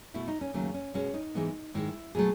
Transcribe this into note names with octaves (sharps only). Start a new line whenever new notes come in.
B2 A3 E4
D#4
C#4
D#2 C#3 F#3 A3 C#4
C#4
B2 G#3 B3 C#4
D#4
G#2 E3 G#3 B3
G#2 D#3 G#3 E4
B2 F#3 A3 G#4